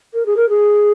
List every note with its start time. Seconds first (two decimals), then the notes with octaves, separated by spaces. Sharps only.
0.14 A#4
0.26 G#4
0.36 A#4
0.49 G#4